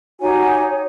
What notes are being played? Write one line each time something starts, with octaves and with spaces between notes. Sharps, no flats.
D#4 F#4 G4 C#5 G#5